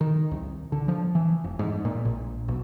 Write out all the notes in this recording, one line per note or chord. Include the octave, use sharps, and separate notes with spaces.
D#3
C2
D3
F3
E3
F1
G#2
A#2
A#1
B1